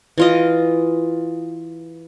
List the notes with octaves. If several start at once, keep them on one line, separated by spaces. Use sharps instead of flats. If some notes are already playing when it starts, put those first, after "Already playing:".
E3 F4 D#5